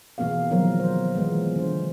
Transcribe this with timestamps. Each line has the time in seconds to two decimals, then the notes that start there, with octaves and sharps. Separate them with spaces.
0.18 B2 E3 A#3 B3 G#4 F5
0.51 D#3 F3 F#3 A#3 A#4
0.80 C5
1.15 E3 G#3 B3
1.56 D3 C5